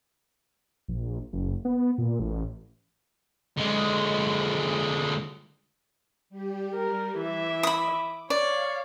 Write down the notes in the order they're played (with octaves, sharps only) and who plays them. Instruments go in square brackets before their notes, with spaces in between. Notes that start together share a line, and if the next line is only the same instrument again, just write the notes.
[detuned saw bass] A#1
F#1
B3
A#2
A1
[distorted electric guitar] D3 G#3
[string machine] G3 G4
[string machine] G3 [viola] A#4
[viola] E3 E5 [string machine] D6
[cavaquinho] B5 D#6
[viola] C#5 [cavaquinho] D5 [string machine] F5